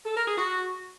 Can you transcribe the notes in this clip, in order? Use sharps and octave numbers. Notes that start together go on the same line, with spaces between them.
A4
A#4
G#4
F#4